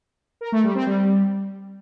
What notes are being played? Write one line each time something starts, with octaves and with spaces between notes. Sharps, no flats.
A#4
A3
G3
C4
G3